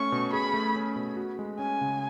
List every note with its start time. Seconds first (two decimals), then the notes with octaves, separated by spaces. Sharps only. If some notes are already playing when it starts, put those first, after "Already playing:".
Already playing: A3 C#4 C#6
0.12 B2
0.33 G#4 B5
0.54 A3
0.76 C#4
0.96 B2
1.17 F#4
1.39 G#3
1.59 C#4 G#5
1.81 C#3